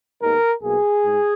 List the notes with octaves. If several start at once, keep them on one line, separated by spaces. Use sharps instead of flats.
D#2 D#3 G#3 B3 A#4
B1 B2 A#3 G#4
G#2